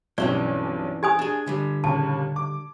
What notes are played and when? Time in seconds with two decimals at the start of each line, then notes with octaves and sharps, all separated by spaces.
0.18 B1 G2 E3 C4 C#4 D5
1.03 G4 G#5 D#6 G#6
1.19 D4 G#4
1.47 D3 G3
1.84 D#2 A#2 C#3 A5
2.36 D6